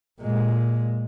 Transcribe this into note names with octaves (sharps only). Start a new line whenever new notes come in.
A#2 G#3